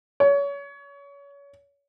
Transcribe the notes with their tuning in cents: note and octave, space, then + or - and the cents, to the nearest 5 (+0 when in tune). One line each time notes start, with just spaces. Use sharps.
C#5 +30